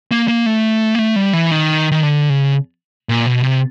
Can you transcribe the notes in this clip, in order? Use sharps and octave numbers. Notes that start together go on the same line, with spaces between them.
A#3
A#3
A3
A#3
A3
G3
E3
D#3
D#3
D3
C#3
A#2
B2
C3